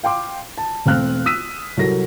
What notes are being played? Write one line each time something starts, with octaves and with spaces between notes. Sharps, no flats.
F5 G5 C6 D6
A5
E1 A3 C4 F5 F6 F#6
D#6 E6 B6 D#7
C2 F#3 F#4 A4 A#4 A#6